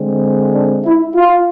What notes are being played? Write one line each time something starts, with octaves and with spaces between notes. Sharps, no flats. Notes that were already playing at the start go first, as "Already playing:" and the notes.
Already playing: D3 G#3 C4
D4
E4
F4